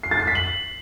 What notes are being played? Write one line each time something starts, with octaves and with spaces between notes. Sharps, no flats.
C7
A6
C7
B6
F#7